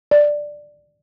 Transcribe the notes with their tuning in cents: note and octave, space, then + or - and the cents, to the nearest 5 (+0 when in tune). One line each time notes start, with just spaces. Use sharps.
D5 +5